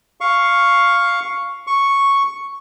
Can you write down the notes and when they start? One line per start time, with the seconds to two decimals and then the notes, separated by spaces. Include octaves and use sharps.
0.21 F5 C#6
1.67 C#6